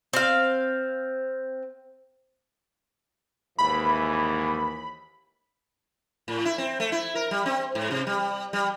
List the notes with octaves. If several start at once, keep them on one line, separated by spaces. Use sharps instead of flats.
C4 F5
D#2 G#2 E3 B5
A2
E4
C4
A3
E4
A#4
G3
C4
G#2
C3
G3
G3